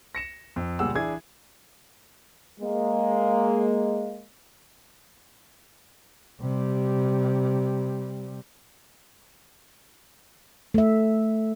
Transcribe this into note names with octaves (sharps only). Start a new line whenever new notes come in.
A#6 C#7 E7
F2
C#2 A#2 G3 G#4 F#5 E6
E3 D4 E4 G#4 G#6
G#3 A#3
C3 G3
A3 E5